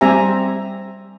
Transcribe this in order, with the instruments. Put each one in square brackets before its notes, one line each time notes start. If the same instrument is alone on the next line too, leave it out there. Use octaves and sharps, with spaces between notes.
[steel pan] G3 C4 G4 E5 G#5 A#5